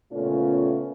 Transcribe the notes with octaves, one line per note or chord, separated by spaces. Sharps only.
A#2 C#3 A3 B3 C#4 F4